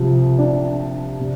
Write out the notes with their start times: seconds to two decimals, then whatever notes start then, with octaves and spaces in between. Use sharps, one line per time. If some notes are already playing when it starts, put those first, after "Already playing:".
Already playing: C2 C3 F3 C4
0.39 D4
1.20 C3